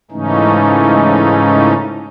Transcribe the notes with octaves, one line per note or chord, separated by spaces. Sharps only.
G#2 C#3 E3 A3 C#4 D#4